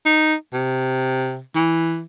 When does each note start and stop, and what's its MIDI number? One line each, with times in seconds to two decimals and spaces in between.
0.06 0.35 63
0.54 1.40 48
1.56 2.03 52